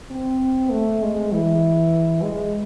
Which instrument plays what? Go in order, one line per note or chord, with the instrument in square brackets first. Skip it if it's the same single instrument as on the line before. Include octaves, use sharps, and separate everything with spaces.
[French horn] C4
A3
G#3
E3
G#3